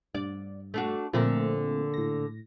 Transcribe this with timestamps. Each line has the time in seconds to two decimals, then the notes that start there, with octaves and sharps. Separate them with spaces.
0.15 G2 D5
0.74 A3 D4 F#4
1.13 A#2 D3 F3 A3 C4 A#4
1.94 A2 A#6